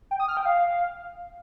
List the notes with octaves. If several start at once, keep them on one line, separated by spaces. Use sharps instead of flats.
G5
D#6
F6
G5
F5